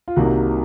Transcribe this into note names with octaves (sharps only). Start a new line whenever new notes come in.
F4
C2 C3 D#3 G3 A#3 F#4